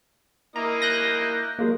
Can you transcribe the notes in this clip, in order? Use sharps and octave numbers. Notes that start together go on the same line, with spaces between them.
A#3 E4 D#5 A#5
F#6 G6 A#6
F#3 G#3 A#3